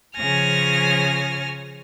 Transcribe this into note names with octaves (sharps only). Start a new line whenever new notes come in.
C#3 F3 C#5 G#5 F6 A#6